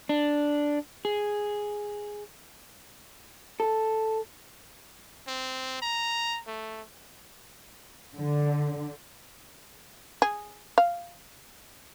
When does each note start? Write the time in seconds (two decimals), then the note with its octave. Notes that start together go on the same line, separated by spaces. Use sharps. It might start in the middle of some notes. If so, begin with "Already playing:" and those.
0.09 D4
1.05 G#4
3.60 A4
5.28 C4
5.82 A#5
6.47 A3
8.16 D3
10.22 G#4
10.78 F5